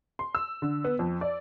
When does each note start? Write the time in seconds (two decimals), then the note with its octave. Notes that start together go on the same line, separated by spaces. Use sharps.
0.19 C6
0.35 E6
0.62 D3
0.84 B3
0.99 F2
1.21 D5